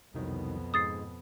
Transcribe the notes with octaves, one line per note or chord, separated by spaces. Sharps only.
C2 F2 B2 D#3 F#3
G#2 G#3 D#6 A6 C7